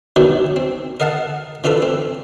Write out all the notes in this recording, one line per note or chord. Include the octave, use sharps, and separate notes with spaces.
B2 D#3 F#3 D4
C4
A#4 D#5 F5 F#5 A5
E3 D4 F4 A4 B4
C4